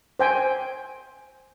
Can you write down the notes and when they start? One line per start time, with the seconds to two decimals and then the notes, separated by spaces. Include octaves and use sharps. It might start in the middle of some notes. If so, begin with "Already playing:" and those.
0.19 C5 G5 G#5